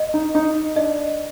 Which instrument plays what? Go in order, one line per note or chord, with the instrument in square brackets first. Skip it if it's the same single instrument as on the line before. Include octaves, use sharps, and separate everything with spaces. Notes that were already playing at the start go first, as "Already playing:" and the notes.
Already playing: [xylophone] D#5
[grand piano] D#4
[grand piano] D#4 [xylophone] D#5
[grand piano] D4 [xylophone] D#5